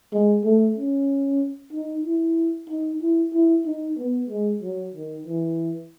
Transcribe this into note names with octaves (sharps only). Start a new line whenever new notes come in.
G#3
A3
C#4
D#4
E4
D#4
E4
E4
D#4
B3
G#3
F#3
D#3
E3